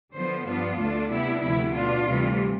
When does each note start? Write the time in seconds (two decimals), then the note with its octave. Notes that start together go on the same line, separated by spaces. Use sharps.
0.15 D3 F3 B3 C5
0.47 G2 F3 B3 D4 F4
0.79 D2 D3 A3 D4
1.11 C3 G3 B3 D4 E4
1.43 D2 C3 F3 B3 E4
1.75 B2 B3 D4 F4
2.07 D2 C3 E3 G3